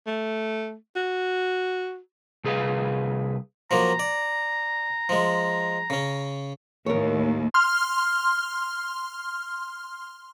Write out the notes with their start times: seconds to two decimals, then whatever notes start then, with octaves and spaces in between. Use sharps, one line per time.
0.06 A3
0.96 F#4
2.44 C2 G#4 B4 F5
3.71 F3 F#3 A#3 A#5
3.99 D5
5.09 F3 G#3
5.90 C#3 C#4
6.86 D#2 A2 A#4 C#5
7.54 C6 F6